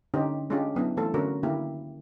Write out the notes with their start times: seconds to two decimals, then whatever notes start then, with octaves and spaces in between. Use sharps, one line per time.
0.14 D3 C#4 D#4 G4 C5
0.50 G#3 C#4 D4 F4 G4
0.75 F#3 B3 D4 E4
0.97 E3 A3 C4 F4 A4
1.14 D3 C4 C#4 F#4 A#4
1.43 D3 D#3 A#3 E4 G4